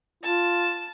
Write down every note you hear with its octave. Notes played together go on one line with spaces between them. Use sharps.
F4 A5